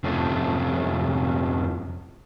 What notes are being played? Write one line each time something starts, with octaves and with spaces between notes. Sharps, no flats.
F2 C3 F3 A3 C#4